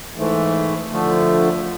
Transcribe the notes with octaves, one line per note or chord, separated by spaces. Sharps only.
G#2 E3 A3
D3 F3 A3